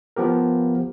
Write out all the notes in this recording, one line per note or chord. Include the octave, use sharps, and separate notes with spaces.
F3 B3 G4 A#4